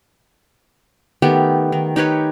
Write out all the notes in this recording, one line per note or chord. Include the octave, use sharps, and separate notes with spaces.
D#3 A3 B3 G4
D#3
D#4 G4 B4 C#5